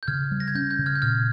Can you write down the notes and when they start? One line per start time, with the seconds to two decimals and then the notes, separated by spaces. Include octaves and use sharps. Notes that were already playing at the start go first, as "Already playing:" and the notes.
0.03 G6
0.08 C#3 F6 G#6
0.31 G3
0.40 A#6
0.48 G#6
0.55 C#4 G6
0.71 G6
0.79 C#3
0.86 F6 G#6
0.95 G6
1.02 A#2 F6 G#6